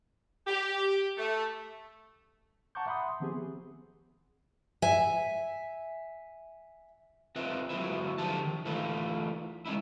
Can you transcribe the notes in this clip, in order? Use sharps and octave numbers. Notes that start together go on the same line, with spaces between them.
G4
A3
F#5 A5 A#5 C#6 D6 G6
E5 F#5 B5 C6 D#6
D#3 F3 B3 C4 G4 G#4
E5 G#5
C4 F4 B4 D#5 E5
F#3 A#3 E4 B4 E5
D3 F3 G4 A5
D#3
E3 A3 D#4 F4 B4
G#3 C#4 D#4 E4